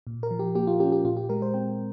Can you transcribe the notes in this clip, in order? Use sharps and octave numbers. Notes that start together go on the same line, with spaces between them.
A#2
A#4
F3
G4
A#3 G4
F4
C#4 G4
G4
A#2 F4
G4
G#3 A#4
C5
C4 G5